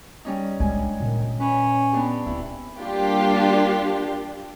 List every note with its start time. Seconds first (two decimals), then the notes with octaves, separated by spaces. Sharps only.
0.25 G3 C#4 D#4
0.60 G3 G#3 D4 G#5
1.00 A#2 D#3
1.40 C#4 B4
1.93 B3 D4 G4
2.26 D1 C4 E4
2.78 G3 A#3 D4 F4 G4